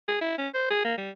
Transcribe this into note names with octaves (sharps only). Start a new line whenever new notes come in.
G#4
E4
C#4
C5
G#4
A#3
G3